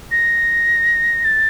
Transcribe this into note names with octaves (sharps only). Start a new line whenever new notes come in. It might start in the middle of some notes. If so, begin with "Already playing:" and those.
A#6
A6